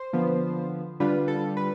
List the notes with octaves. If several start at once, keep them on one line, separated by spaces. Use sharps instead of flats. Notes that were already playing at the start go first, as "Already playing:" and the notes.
Already playing: C5
D3 F3 B3
D3 G3 D4 F4 B4
A4
B4